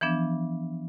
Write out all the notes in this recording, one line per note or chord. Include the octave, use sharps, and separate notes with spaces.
E3 F3 B3 D4